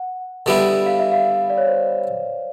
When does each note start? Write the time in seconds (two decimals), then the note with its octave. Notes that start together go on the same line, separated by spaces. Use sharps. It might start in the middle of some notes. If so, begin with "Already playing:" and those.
Already playing: F#5
0.46 D3 G3 B3 E4
0.86 F5
0.99 E5
1.12 F5
1.50 D5
1.58 C#5
1.67 C5